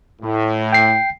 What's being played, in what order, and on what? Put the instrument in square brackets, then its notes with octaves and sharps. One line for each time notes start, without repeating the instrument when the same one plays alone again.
[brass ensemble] A2
[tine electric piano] G5 C7